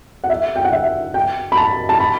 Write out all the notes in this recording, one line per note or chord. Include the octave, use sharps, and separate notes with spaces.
F#5
E5
G5
F#5
E5
G5
B5
A5
A5
B5